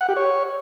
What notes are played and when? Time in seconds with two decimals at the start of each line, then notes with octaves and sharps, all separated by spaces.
0.01 F#5
0.09 G4
0.16 C#5